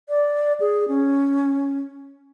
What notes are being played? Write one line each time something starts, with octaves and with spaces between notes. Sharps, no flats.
D5
G#4
C#4